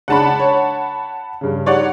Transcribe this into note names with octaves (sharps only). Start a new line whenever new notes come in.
C#3 G#3 D4 F#5 A5 B5
C#5
G2 C#3
G3 D#4 C#5 D5 F#5